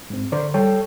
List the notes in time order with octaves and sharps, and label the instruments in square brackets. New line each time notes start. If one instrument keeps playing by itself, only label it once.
[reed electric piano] G#2 C4
[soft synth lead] D3 [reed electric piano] A#4 C5 D5
[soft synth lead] G3 [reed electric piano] A4 C#5 G5